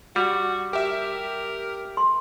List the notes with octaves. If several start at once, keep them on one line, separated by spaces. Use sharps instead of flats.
G3 F#4
G4 A#4 E5
C6